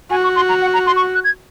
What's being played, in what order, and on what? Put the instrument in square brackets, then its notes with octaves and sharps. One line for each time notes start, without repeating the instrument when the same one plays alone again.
[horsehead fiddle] F#4 [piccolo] G#5
[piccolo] C#6
C6
A#5
F#5
A#5
C6
C#6
F#6
G#6